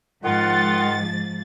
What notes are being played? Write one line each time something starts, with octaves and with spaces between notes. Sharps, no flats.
G#2 D#3 F3 F4 F#5 A6